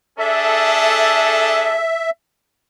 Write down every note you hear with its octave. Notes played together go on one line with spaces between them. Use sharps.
D4 G#4 A4 E5